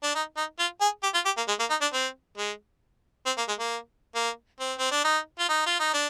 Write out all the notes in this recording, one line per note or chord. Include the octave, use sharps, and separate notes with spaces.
D4
D#4
D#4
F4
G#4
G4
F4
G4
A#3
G#3
A#3
D#4
D4
C4
G#3
C4
A#3
G#3
A#3
A#3
C4
C4
D4
D#4
F4
D#4
F4
D#4
D4